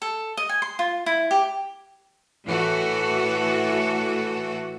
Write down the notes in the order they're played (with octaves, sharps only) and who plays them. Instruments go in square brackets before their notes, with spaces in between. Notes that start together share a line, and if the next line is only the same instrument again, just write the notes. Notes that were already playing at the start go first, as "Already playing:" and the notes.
[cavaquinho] A4
D#5
G#5
C6
F4
E4
G4
[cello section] A2 E3 A3 F#4 A4